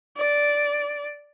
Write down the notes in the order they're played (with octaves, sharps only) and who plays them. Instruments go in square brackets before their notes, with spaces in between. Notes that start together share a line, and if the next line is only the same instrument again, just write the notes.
[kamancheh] D5